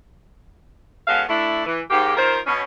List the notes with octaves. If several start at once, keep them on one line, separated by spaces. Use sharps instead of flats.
G#3 B3 C#4 F#4 A4 F5
A3 D4 E4
E3
G#2 A#3 G4
D#3 F4 A#4 C5
B2 C#4